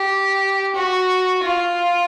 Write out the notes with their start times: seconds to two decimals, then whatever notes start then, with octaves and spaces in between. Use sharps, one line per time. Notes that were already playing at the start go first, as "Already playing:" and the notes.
Already playing: G4
0.75 F#4
1.43 F4